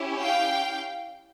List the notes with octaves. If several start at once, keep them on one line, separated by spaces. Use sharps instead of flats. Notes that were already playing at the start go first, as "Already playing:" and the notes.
Already playing: C#4 E4 G4
F5 G5